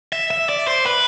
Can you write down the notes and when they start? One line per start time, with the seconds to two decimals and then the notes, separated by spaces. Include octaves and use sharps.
0.13 E5
0.31 E5
0.49 D5
0.67 C5
0.86 B4